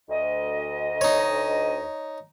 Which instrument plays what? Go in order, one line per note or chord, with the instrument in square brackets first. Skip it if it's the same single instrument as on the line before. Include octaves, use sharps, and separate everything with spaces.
[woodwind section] D2 D#5
[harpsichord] D#4 C#5